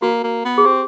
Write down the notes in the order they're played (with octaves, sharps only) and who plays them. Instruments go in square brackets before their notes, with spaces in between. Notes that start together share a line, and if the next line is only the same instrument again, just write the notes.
[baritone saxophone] A#3 [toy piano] F#4
[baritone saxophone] A#3
B3
[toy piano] G#4
[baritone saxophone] C4 [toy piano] G4